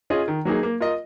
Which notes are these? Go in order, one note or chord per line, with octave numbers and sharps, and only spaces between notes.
C#4 F4 G#4 D#5
D#3
F#3 A#3 D#4 G#4
A#3
F4 A#4 D#5